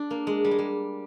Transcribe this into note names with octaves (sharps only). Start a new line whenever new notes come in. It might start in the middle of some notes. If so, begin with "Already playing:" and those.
Already playing: D4
A#3
G#3
G3
G#3
G3